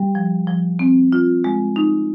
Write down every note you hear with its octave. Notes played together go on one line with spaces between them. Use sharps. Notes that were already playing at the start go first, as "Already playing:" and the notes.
Already playing: G3 G4
F3
F3
C4
F4
G#3
D#4